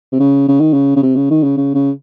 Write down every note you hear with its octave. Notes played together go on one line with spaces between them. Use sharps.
C3
C#3
C#3
D#3
C#3
C#3
C3
C#3
D#3
C#3
C#3
C#3